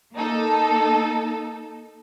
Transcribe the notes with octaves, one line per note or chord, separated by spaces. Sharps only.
A#3 D#4 A4